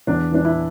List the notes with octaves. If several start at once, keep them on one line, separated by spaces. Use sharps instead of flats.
E2 D4
E3 D4
E4